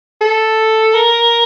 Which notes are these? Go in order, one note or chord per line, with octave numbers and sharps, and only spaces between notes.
A4
A#4